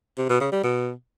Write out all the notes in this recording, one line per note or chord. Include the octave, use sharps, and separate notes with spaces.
C3
B2
C#3
G3
B2